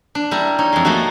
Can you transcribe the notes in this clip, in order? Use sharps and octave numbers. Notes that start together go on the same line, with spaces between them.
D4
G3 E4 A#4
D#4 C#5
F2 G#3
A3 A#3 D#4 F#4